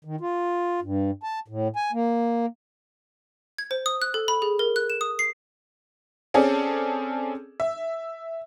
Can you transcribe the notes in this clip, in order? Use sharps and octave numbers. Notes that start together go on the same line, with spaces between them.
D#3
F4
G2
A5
A2
G#5
A#3
G#6
C5
D#6
F#6
A4
B5
G#4
A#4
F#6
E7
D#6
C7
C4 C#4 G#4 A4 D5
E5